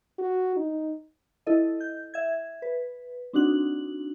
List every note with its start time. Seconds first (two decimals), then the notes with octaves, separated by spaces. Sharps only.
0.18 F#4
0.56 D#4
1.47 E4 A4 D#5
1.80 G6
2.14 E5 G#6
2.62 B4
3.33 C4 D4 D#4 F#4 F#7